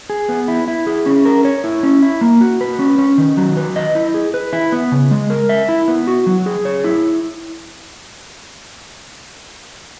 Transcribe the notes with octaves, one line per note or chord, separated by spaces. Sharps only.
G#4
B3
E4
E4
G#4
C#4
A#4
C#5
E4
C#4
E4
A#3
F#4
B4
C#4
C#4
D#3
F#3
B4
D#5
E4
G#4
B4
E4
B3
C#3
G#3
A#4
E5
E4
B3
F#4
F#3
G#4
C#5
E4